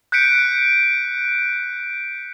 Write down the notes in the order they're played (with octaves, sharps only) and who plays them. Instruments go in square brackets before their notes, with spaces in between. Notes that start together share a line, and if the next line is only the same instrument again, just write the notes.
[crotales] F#6 G6 B6 C#7 D7